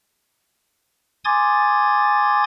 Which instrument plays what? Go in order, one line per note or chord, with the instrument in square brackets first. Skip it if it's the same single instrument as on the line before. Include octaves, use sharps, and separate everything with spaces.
[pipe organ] G#5 C6 D6 D#6 G#6 A6